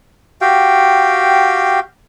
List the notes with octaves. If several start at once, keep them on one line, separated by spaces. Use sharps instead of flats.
F#4 G4 F5 G5